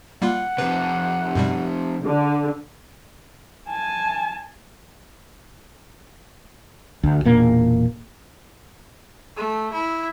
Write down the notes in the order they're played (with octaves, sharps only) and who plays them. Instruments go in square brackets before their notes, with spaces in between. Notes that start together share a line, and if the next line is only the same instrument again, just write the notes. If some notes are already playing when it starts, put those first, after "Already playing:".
[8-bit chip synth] G3 A#3 F4 [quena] F#5
[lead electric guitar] F2 C3 [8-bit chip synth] B4
[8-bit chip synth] F#2 B2 G3
[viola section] D3
[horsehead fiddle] G#5 A5
[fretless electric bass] D2
E1 A#2 A#3
[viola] A3
E4